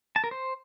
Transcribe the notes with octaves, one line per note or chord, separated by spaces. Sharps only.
A5
A#4
C5